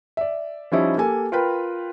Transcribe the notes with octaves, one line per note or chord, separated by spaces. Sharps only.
D5 E5
F3 G3 C#4 D#4 E4
A#3 G4 A4 G#5
F4 A#4 B4 G5 B5